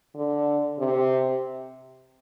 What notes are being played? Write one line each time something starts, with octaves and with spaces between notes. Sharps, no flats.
D3
C3